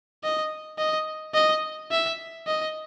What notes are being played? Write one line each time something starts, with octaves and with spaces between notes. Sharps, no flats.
D#5
D#5
D#5
E5
D#5